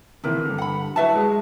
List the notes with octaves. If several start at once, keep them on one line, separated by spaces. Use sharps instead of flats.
D#2 C3 E3 E4 A#4
G2 D3
F#5 B5
F#3 E4 F#4 B4 E5 A5
G#3